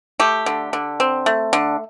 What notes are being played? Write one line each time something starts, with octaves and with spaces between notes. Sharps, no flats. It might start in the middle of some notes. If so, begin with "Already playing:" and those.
A3 G4
D3
D3
C4
A3
D3